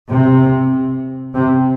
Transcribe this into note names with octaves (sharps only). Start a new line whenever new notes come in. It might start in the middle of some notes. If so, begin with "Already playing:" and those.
C3
C3